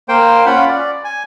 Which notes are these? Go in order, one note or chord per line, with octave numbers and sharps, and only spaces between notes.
A#3 C5 G5
C#4 F4 F#5 B5
D5
G#5